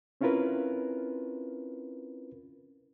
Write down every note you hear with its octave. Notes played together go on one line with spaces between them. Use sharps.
C4 C#4 E4 F4 A#4 B4